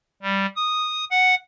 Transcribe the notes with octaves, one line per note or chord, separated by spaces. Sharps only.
G3
D#6
F#5